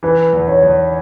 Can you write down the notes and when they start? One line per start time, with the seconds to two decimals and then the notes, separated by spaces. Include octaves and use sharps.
0.03 E3 B4
0.33 E2
0.48 C#5
0.63 E2